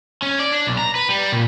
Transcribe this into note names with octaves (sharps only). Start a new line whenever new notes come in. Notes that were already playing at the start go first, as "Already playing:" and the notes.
C#4
D5
D4
B1
A#5
B4
G3
A#2